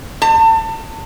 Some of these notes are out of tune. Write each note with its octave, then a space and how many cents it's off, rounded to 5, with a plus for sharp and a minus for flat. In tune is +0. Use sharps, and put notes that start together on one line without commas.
A5 +30